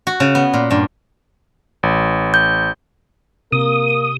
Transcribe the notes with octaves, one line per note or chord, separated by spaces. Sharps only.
F#4
C#3
B3
A#2
G2
A1
G6
C3 A#3 A#4 D#6